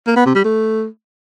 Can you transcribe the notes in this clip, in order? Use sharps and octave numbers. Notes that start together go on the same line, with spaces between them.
A#3
B3
C3
G3
A3